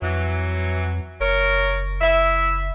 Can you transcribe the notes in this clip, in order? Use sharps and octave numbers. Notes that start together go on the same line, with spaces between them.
F2 E3 F#3
F#1 A#4 C#5
E4 E5